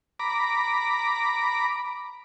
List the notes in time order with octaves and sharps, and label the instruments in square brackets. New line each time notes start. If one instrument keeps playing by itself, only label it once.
[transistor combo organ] A#5 B5 D6